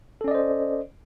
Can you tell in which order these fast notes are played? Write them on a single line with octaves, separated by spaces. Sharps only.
A4 C#4 D5 D#5 C5